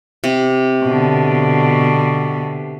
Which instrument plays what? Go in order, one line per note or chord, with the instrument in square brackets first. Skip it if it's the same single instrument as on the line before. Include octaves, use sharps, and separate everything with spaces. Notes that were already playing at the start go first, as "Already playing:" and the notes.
[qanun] C3
[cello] B2 D3